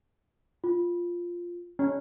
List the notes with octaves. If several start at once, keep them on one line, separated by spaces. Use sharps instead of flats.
F4
C#4